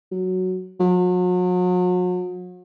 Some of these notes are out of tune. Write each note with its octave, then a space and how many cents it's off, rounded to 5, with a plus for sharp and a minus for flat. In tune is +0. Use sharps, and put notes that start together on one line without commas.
F#3 +0
F#3 -40